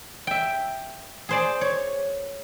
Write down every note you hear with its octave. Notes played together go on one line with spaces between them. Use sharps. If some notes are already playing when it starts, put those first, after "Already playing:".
E5 G5
G#4 C5 D5
C#5